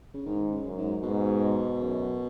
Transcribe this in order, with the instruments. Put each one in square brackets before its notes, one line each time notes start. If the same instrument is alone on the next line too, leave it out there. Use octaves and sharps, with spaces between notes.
[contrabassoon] C#3
[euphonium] G#2 [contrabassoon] D#3
[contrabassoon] C#3
[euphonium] F#2
[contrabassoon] G#2
[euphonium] G#2 [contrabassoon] B2
[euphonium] F#2